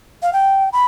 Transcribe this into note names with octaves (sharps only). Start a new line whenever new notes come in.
F5
G5
B5